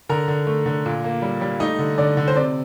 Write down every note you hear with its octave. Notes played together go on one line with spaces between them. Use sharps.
D3 A#4 A#5
D3
A3
D3
A#2
A#3
G3
G3
A3 D#4 D#5
D3
D3 D5
D3
C5
C3 D5